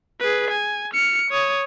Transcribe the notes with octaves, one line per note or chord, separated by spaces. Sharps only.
G#4 B4
G#5
F6 C#7
C#5 D#6